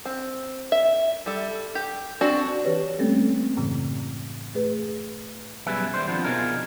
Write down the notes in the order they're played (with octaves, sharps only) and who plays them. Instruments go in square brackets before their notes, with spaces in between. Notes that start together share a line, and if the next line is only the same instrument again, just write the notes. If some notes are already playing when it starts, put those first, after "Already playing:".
[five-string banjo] C4
E5
G3 A4
G4
C4 D4 F#4
[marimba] E3 G4 B4 C#5
G3 A3 A#3 C4 C#4 A4
F#2 A2 C#3 E3
A3 G#4 B4
[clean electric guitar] F#2 B2 G3 G#4 B4 E5
D#2 G3 C5
F3 B3 C4 D4
B2 D#4 F4 G#4 A#4